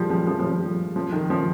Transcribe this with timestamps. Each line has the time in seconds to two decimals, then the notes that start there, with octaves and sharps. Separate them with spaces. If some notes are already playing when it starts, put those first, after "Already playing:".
Already playing: F3 G3 G#3
0.10 F3
0.27 F3
0.39 F3
0.44 G3
0.96 F3
1.12 D#3
1.30 F3